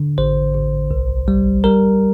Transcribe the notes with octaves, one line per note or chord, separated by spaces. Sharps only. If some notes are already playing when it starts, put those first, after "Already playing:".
Already playing: D3
A1 C5
A1
C2
G3
G3 A#4